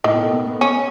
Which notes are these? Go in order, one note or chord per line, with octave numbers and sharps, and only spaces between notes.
A2 D#3
B2
A3
B3
B3
C#4